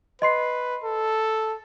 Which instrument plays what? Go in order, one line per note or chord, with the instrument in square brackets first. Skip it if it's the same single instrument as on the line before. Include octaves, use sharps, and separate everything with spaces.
[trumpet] B4 [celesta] D#5 C6 C7
[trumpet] A4